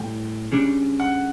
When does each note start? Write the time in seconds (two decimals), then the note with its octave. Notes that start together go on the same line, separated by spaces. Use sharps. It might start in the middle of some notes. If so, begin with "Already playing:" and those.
Already playing: A2 G3 G5
0.52 C#3 G3 D4
1.00 F#5